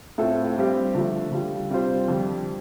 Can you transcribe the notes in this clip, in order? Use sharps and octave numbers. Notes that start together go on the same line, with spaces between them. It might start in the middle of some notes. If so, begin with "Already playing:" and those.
A2 A3 C4 F4 A4
G2 G3 C4 G4
D3 F3 A3
D3 G3 F4
C3 G3 F4 C5
F2 D3 G3